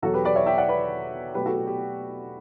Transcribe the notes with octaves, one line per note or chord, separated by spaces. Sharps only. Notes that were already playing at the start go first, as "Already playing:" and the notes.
E2 B2 F#3 F#4 A4
G4 B4
B4 D5
C#5 E5
E5 G5
D5 F#5
B4 D5
B2 F#3 A3 G4 B4
F#4 A4
G4
G4